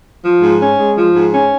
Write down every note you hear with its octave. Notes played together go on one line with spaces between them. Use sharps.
F3
G#2
C#4
G#3
F3
G#2
C#4